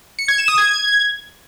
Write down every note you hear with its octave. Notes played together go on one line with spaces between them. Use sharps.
C#7
G#6
E7
D#6
G#6